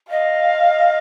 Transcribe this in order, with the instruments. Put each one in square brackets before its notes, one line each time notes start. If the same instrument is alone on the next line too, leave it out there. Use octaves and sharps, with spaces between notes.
[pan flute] D#5 [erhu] F5